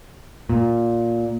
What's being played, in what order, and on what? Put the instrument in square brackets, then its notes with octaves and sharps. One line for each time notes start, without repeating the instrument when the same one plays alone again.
[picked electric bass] A#2